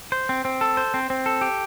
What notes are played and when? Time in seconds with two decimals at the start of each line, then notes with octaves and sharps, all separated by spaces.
0.12 C5
0.29 C4
0.45 C4
0.61 A4
0.77 C5
0.94 C4
1.10 C4
1.26 A4
1.41 G4